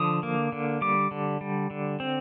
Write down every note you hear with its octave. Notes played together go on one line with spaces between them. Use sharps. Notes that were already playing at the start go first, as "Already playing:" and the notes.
Already playing: D3 F3 D#6
A#3
D3
G3 D6
D3
G3
D3
C4